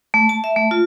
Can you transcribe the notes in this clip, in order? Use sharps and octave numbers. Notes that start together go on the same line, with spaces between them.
A3
A5
E5
A3
F4